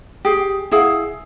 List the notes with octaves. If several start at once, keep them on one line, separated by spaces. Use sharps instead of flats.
G4 G#4
E4 G#4 F5 F#5